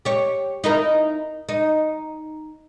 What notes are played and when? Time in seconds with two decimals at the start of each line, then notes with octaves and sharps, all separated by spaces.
0.05 G4 C#5
0.64 D#4 E4 A#4
1.49 D#4